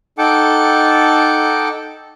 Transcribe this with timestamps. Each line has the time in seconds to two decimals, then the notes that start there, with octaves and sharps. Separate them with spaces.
0.18 D#4 A4 F#5 G5 A5 D6